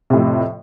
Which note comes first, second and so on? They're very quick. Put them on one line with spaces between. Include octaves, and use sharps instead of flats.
C3 A2 F2